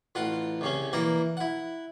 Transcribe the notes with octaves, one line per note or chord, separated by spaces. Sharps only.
A1 F4 F#5
C2 C#3 C#4
E3 A#3 D5 A#5
E4 F#5